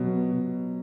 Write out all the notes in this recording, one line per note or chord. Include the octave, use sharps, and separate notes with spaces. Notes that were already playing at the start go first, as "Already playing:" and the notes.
Already playing: B2 F#3
B3
B2